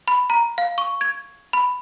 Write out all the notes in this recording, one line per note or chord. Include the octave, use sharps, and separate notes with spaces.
B5
A#5
F5
C#6
G#6
B5